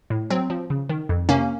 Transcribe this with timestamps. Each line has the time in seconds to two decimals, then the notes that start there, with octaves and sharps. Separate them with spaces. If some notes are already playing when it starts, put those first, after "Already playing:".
0.10 A2
0.30 F#3 C4
0.50 F3
0.70 C#3
0.89 D#3
1.09 F2
1.29 C3 A#3 C#4